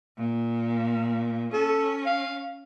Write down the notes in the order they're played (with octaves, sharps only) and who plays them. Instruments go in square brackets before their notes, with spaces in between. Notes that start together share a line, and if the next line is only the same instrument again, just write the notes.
[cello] A#2
[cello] C#4 [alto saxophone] A4
[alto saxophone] F5